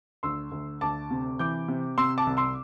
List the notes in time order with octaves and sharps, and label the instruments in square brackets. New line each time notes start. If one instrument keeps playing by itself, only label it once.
[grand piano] D2 C6 E6
D2
D2 A5 D6
C3
E3 D6 G6
C3
C3 C6 E6
A5 D6
C2
C6 E6